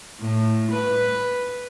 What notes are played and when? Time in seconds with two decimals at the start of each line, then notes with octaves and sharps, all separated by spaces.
0.20 A2
0.72 B4